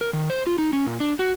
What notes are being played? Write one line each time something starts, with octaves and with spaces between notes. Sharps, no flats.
A#4
D#3
C5
F4
D#4
C#4
A#2
D4
F#4